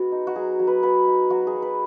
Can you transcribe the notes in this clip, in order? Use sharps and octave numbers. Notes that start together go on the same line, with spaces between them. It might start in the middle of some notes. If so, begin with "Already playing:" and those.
Already playing: G#3 B3 F#4
D#4
F#4
F#3 G#4
F#3
B4
B3 B4
D#4
F#3 F#4
G#4
F#3
B4